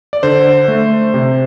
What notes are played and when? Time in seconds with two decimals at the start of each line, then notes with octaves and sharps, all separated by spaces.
0.13 D5
0.23 D3 C5
0.68 A3
1.14 C3